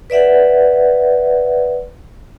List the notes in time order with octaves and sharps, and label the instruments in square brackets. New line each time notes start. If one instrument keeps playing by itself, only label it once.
[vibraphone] B4 D5 E5 F#5